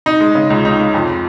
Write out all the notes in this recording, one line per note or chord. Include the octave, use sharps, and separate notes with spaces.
D#4
G#3
C#3
C#2
D#4
G#3
F2